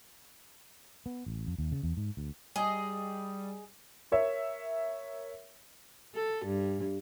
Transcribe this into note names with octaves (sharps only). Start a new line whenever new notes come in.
B3
A1
F2
D#2
C#3
E2
G#2
D2
G3 G#4 D#5
A#4 C#5 E5
A4
G2